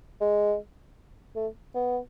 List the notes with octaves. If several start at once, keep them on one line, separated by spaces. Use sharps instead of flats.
G#3
A3
B3